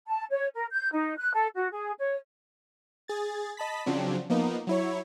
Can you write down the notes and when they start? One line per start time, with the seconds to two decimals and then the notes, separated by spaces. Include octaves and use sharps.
0.07 A5
0.30 C#5
0.55 A#4
0.71 G6
0.91 D#4
1.17 F#6
1.33 A4
1.56 F#4
1.71 G#4
1.98 C#5
3.08 G#4 A6
3.57 D#5 A5 B5 B6
3.86 C#3 F3 F#3 C4 D4
4.30 F3 A#3 B3 D#4
4.67 F#3 E4 C#5